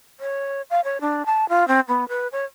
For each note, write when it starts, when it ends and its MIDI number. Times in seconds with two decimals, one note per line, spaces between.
0.20 0.62 73
0.70 0.80 77
0.84 1.00 73
1.01 1.26 62
1.26 1.48 81
1.49 1.67 65
1.68 1.80 60
1.88 2.08 59
2.08 2.28 71
2.32 2.45 73